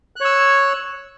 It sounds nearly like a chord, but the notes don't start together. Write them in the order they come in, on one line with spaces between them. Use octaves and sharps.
F#6 C#5 E6